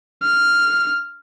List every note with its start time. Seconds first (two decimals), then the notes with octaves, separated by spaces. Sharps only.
0.24 F6